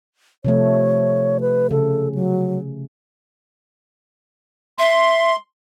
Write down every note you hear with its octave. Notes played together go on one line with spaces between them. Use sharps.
C3 F3 A3 C#5
B4
C#3 A4
F#3
E5 C6